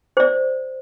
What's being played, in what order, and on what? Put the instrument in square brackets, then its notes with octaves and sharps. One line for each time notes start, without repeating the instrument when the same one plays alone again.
[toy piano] C5 D5